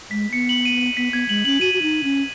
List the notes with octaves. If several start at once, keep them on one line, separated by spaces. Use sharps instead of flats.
G#3 B6
B3 C#7
F#7
D#7
D#7
B3 B6
B3 G#6
G#3 F#7
C#4 F#7
F#4 D#7
F#4
D#4
C#4